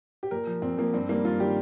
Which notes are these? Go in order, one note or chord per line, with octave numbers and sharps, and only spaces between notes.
G4
A#2 A#4
F3
A#2 C4
F3 A#3
G2 C4
D#3 G3 A#3
G2 F4
D#3 G3 G4